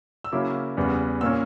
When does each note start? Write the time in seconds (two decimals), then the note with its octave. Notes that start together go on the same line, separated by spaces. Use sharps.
0.24 E6
0.32 C#3 F#3 A#3 C#4 E4 D6
0.77 E2 C#3 G3 B3
1.21 A#2 A#3 C#4 E6